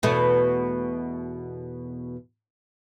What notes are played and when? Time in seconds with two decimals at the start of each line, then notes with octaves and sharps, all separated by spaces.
0.03 E2 B2 A3